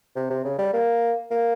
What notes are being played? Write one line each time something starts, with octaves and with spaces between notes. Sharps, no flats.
C3
C3
C#3
G3
A#3
A#3